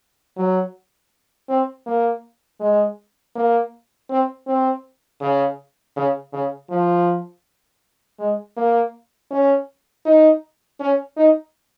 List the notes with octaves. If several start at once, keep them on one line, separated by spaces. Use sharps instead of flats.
F#3
C4
A#3
G#3
A#3
C4
C4
C#3
C#3
C#3
F3
G#3
A#3
C#4
D#4
C#4
D#4